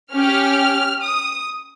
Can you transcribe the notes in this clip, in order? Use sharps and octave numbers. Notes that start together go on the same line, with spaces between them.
C#4 G4 F6
D#6